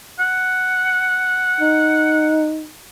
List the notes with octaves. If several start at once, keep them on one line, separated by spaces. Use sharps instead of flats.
F#5
D#4